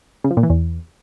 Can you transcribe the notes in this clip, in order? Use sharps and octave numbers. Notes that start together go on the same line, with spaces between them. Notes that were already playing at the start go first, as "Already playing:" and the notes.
C#3
F3
A#2
E3
E2